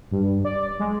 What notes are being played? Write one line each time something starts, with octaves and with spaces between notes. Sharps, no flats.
G2
D5
G#3